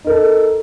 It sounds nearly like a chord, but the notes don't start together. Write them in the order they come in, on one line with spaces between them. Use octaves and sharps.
D#4 A#4 A4